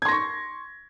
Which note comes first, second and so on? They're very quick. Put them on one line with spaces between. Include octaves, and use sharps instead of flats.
G#6 C6 A#6 C#6